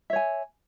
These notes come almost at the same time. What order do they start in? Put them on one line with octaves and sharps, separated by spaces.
E5 C#5 G#5